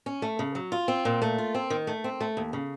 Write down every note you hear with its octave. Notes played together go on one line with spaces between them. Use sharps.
C#4
A3
C#3
F#3
F4
C4
A#2
A3
F4
C4
D#3
A3
C4
A3
D#2
C#3